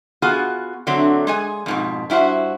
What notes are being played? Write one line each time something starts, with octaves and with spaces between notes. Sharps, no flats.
B3 F4 F#4 G#4
D3 F#3 A3 C4
G#3 G#4 G#5
F2 G#2 B2
G2 E4 F#4 C5